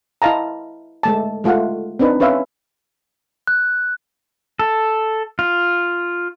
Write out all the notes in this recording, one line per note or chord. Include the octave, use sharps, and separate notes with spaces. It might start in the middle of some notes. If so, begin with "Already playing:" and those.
E4 D#5 F5 A5 A#5
G#3 A3 A5
G#3 A3 F4 F5 F#5
C4 D4 D#4 B4
C#4 B4 C#5 E5 F5
F#6
A4
F4